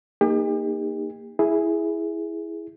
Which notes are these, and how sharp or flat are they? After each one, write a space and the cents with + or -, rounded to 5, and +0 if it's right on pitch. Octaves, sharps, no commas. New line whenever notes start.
A#3 +0 D#4 +0 G4 +40
E4 +0 G#4 +0